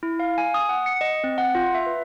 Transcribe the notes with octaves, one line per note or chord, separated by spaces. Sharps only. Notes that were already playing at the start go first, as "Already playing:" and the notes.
E4
F5
G#5
D#6
F#5
C#7
D#5
C4
F#5
F4
E5
B4